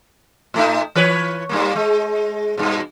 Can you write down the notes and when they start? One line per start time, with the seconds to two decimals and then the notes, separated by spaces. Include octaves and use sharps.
0.54 A2 A3 D#4
0.95 E3 B4 C#5
1.49 G2 G3 A#3
1.76 G#3
2.57 G2 B2